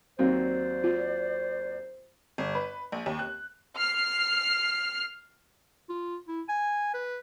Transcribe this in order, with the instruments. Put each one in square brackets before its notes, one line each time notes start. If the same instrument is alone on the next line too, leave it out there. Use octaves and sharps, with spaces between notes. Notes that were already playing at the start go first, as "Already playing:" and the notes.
[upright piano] D#2 F#3 C4 [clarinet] C5 [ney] D5
[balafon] F4
[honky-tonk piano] G1
B4
A#1
D#2
F#6
[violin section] F6 C7
[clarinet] F4
E4
G#5
B4